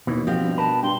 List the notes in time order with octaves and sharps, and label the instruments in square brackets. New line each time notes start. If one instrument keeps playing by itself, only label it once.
[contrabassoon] D#2 [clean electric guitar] B2 E3
[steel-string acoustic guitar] B2 G4 F5 [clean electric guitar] F3 C4
[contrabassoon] G2
[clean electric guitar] A#4 B4 [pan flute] A5
[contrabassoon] G2 [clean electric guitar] G5 [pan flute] C6